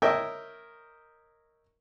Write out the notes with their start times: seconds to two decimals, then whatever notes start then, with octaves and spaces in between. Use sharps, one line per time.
0.02 A#4 C#5 D#5 E5 G5